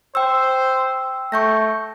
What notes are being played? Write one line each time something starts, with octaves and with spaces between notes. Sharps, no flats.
C5 G5 E6
A3 C#6 G6 A#6